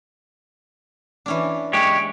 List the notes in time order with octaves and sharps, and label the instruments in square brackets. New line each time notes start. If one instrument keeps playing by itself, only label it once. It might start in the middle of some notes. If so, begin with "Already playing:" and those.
[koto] E3 C#4 D4
[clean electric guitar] G#3 G4 C#5